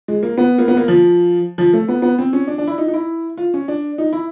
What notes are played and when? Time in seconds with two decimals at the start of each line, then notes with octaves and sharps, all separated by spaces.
0.08 G#3
0.23 A#3
0.38 B3
0.58 A#3
0.68 B3
0.77 A#3
0.88 F3
1.58 F3
1.73 A3
1.89 B3
2.02 B3
2.19 C4
2.33 C#4
2.47 D4
2.58 D4
2.68 E4
2.78 D#4
2.88 D#4
2.94 E4
3.38 F4
3.54 C#4
3.68 D4
3.98 D#4
4.13 E4